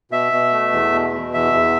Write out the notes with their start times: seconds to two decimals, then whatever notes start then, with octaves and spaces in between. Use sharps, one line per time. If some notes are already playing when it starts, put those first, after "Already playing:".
0.11 B2 E5
0.32 B2
0.52 A3
0.72 E2
0.92 B2
1.12 B2
1.34 E2 E5
1.53 E2